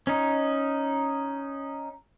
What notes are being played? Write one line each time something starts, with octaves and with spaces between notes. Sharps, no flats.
C#4 D#4